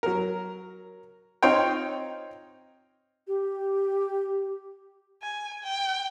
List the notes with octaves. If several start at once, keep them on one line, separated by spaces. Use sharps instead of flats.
F#3 A#4
C4 D#4 F4 C#5 G5
G4
G#5
G5